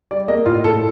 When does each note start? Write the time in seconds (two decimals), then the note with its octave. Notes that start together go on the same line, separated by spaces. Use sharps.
0.11 G3 D5
0.28 A#3 D#5
0.46 A2 F4
0.64 A2 A4